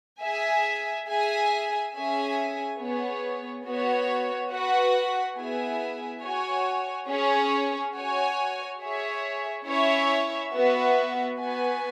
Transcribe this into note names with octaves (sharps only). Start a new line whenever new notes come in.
G#4 E5 G#5
G#4 E5 G#5
C#4 G#4 E5 G#5
B3 G#4 C#5
B3 F#4 C#5
F#4 B4 F#5
B3 E4 G#4 E5 G#5
F#4 C#5 G#5
C#4 G#4 C#5
F#4 C#5 G#5
G#4 C#5 E5
C#4 E4 C#5 E5
B3 F#4 B4 E5
B3 F#4 B4 G#5